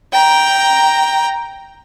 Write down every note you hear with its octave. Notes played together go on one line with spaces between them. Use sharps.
G5 A#5